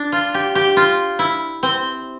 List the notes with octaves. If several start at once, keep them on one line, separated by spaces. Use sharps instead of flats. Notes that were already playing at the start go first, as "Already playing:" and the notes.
Already playing: D4
F4
G4
G4
F4
E4
C4